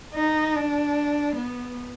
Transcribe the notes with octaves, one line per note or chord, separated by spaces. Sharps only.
D#4
D4
B3